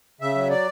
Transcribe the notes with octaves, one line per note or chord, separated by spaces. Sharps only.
C#3 E5
F#3
D5